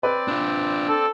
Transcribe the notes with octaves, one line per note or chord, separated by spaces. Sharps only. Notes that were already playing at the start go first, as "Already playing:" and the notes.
C4 B4 D5
D4 F4
A4